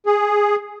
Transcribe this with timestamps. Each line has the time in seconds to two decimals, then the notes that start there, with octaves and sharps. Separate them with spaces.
0.06 G#4